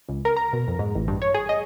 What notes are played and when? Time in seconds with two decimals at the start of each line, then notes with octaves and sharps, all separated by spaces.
0.09 C#2
0.25 A#4
0.37 A#5
0.53 B2
0.68 F2
0.79 G#2
0.95 A1
1.08 G2
1.22 C#5
1.34 G#4
1.49 D#5